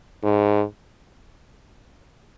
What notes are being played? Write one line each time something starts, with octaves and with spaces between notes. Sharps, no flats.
G#2